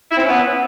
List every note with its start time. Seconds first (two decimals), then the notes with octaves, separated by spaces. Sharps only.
0.11 E4
0.17 C4
0.23 C#4
0.29 B3